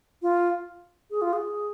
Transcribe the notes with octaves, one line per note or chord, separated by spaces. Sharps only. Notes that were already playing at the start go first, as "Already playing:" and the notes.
F4
G#4
F4
G#4